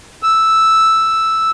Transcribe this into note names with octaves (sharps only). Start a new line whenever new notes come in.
E6